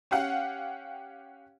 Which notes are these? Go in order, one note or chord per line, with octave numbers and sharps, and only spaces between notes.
C#4 G4 F5 F#5